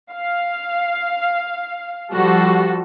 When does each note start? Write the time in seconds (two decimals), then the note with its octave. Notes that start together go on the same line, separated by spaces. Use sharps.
0.13 F5
2.12 F3 G3 F#4 A4